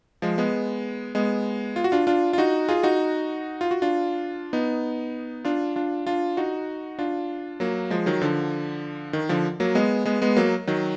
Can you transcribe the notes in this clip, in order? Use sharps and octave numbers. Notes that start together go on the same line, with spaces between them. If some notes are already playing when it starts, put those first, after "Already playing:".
F3 G#3
G#3 B3
G#3 B3
F4
F#4
D4 F4
D4 F4
F4
D#4 F#4
F4 G#4
D#4 F#4
F4
F#4
D4 F4
B3 D#4
D4 F4
D4 F4
D4 F4
D#4 F#4
D4 F4
F#3 A#3
F3 G#3
D#3 F#3
D3 F3
D#3
D3 F3
F#3 A#3
G#3 B3
G#3 B3
G#3 B3
F#3 A#3
D#3 F#3